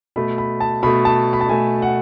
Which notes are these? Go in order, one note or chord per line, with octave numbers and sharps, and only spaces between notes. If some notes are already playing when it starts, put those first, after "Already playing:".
B2 A3 B5
B5
A5
B2 A3 B5
A5
B5
A5
B2 A3 G#5
F#5